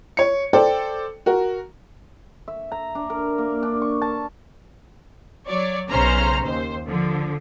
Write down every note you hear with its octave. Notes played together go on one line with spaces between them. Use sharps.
C#5 C#7
A4 C5 D5 G5
F#4 A#4
E5
A#5
D4
A#4
A#3
D4
C#6
A5
F#3 C#5 D5
B1 C#3 C#4 C5 A#5 F6
D#2 C5
D3 F3